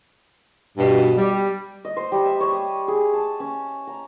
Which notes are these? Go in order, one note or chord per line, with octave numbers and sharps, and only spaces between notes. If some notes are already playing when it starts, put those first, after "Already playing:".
G2 B2
G3
D#5
C5
G3
E5
C#5
D#6
G#4
A5
C#4
A#5